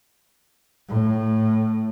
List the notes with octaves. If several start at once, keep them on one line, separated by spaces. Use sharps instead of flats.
A2